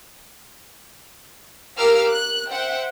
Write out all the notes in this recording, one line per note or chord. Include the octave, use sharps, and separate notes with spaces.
G4 A#4 F5 D6 E6 F6
F#6
C5 E5 F#5 G5